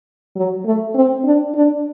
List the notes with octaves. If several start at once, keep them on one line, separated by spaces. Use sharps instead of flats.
F#3
A3
C4
D4
D4